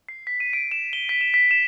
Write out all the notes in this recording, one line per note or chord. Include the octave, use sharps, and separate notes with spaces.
C7
B6
D#7
D7
E7
G7
B6
E7
B6
E7